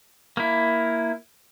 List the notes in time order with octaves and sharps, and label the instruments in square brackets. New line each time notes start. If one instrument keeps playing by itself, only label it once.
[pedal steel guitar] A#3 E4